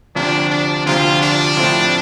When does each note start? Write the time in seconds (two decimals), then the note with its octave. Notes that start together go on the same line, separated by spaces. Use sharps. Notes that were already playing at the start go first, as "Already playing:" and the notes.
0.15 D2 C3 F3 D4
0.50 D4
0.86 D2 C3 F3 F4
1.21 D4
1.56 A2 F3 C4 E4